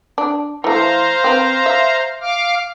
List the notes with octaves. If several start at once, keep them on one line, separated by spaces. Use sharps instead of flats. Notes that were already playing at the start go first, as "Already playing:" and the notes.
D4
E3 A3 C5 F5 A#5
C4 B4
E5
F5 D6 F6